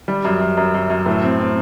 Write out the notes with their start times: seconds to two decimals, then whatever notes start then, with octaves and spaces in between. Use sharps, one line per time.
0.08 G3
0.25 F#2
0.41 F#2
0.57 F#2
0.74 F#2
0.90 F#2
1.06 A2
1.24 C4
1.39 C4